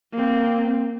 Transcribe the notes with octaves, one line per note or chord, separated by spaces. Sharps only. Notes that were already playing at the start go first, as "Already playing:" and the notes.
A#3 C4